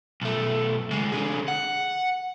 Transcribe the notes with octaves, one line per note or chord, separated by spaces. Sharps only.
B1 A3
C#3 G#3
D3 G#4
F#5